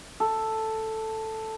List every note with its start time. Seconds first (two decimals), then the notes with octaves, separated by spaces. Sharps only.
0.20 A4